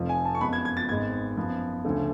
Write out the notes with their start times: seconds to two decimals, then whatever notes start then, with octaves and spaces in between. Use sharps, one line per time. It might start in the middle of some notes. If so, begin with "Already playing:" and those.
Already playing: F1 F2 F3
0.09 G#5
0.25 A5
0.35 C#6
0.41 F#2 F3 G#3 B3 B5
0.53 G#6
0.65 G#6
0.77 A6
0.89 G#1 G#2 G#3 B3 G#6
1.37 F#2 F3 B3
1.85 D2 C#3 F3 A3